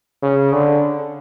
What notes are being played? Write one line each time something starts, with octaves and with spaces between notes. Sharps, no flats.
C#3
D3